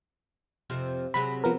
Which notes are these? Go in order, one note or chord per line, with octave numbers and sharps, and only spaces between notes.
F2 C3 F3
C3 F#3 G#3 B5
F3 B3 A#4